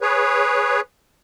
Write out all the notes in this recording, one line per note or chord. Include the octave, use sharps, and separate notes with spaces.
G#4 B4 C#5